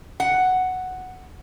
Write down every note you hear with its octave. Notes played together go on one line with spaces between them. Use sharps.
F#5